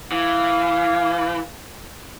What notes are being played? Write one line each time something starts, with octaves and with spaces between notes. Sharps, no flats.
E3 F5